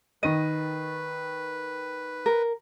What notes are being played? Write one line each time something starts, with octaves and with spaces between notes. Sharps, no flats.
D#3 B4 D#5 D#7
A#4